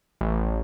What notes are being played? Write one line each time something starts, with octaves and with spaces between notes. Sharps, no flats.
A1